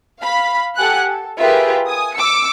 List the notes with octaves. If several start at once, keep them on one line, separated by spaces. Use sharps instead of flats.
F5 B5
G4 A4 F#5 G#5 F#6
A4
F4 G4 G#4 A#4 B4 E5
G#5 D#6
D6 E6 C#7